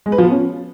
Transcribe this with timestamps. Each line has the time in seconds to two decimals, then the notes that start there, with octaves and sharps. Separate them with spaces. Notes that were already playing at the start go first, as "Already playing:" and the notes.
0.06 G#3
0.12 B4
0.18 F3
0.25 B3
0.31 C#4